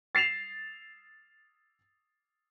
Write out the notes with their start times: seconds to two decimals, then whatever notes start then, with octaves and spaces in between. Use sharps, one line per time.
0.15 A6 C7 E7 F7